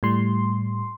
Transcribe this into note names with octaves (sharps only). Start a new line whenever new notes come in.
A2 G3 C6